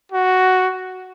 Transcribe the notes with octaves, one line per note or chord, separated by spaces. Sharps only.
F#4